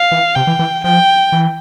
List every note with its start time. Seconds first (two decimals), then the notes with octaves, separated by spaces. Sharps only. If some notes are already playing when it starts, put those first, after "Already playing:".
Already playing: F5
0.12 E3
0.36 C3 G5
0.47 E3
0.59 E3
0.84 F3 G5
1.32 E3